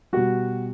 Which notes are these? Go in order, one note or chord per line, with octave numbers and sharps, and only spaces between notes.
B2 G3 F#4